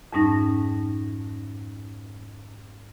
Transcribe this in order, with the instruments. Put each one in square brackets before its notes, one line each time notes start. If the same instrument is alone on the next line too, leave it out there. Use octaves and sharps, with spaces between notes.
[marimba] F2 G#2 G3 C#4 D#4 A#6